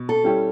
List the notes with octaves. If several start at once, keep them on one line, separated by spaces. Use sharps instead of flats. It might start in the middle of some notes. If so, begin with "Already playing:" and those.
Already playing: B2
A4
G3 C#4 E4 G4